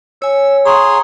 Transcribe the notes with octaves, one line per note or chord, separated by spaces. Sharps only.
C#5 G#5 E6
G#4 C#5 F#5 A#5 C6